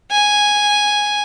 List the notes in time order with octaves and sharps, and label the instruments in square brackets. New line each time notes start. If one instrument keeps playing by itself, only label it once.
[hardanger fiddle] G#5